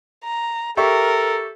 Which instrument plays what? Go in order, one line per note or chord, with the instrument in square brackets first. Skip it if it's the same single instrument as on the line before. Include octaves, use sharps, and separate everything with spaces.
[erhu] A#5
[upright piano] G4 E5 C#6 [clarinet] A4 [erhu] A#4